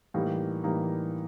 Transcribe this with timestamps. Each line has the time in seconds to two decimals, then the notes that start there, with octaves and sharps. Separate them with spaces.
0.14 A2 E3 G3 A#3 D#4
0.64 A2 E3 G3 A#3 D#4